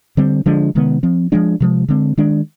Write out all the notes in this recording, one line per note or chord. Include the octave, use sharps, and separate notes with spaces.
D3 G3 C4
D3 F3 G#3 D4
C3 D#3 G#3 B3
F3 C4
F3 G#3 D4
C3 F3 G#3
D3 G#3 C4
D#3 G#3 D4